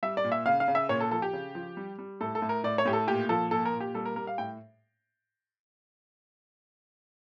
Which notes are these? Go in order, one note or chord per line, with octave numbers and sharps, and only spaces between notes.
G3 E5
D5
A#2
E5
C#3 F5
F5
C#3
E5
A#2 C#5
A4
F3 A4
G4
C#3
F3
G3
G3
A2 A4
A4
A2
A#4
A2 D5
C#5
A2 G4
A4
A#2 G4
F3 A4
A#2 A4
A#4
A#2
G4
G3 A4
A#4
G3 A#4
F5
A2 G5